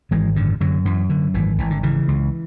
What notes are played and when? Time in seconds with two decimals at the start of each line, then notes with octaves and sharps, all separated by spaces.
0.11 G#1 E3 G#3
0.36 F#2 D3
0.61 F#2 D3 F#3
0.85 F#2 E3
1.09 F#2 D3
1.34 G#1 E3
1.58 G#1 E3
1.70 D3
1.83 C#3 E3
2.08 C#2